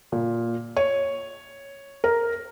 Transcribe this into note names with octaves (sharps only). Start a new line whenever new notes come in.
A#2
C#5
A#4